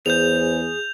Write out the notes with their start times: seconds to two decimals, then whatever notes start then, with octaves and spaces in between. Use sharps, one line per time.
0.06 E2 G#4 C5 G6 F7